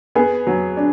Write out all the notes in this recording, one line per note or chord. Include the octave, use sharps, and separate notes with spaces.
B3 G#4
F#3
D4